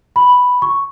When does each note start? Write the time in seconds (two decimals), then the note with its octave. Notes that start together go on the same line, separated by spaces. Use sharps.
0.16 B5
0.62 C#6